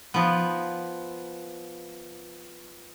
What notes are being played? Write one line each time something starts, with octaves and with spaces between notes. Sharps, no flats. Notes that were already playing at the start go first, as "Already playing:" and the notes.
F3 B3